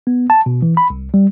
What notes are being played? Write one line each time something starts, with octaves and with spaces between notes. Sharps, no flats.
B3
A5
B2
E3
B5
C2
G3